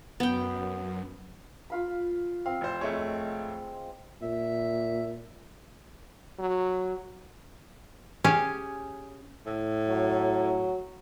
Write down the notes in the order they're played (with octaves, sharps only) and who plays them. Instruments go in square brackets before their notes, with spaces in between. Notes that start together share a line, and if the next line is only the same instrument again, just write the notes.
[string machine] F#2 [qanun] B3 G5
[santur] F4 F5 B5
[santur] C4 [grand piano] F5
[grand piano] F1 C5
[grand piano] F1 A3 C#5 [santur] G#3
[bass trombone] A#2 [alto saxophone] E5
[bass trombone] F#3
[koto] C#4 G4 G#4 F5
[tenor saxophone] A2
[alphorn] F#3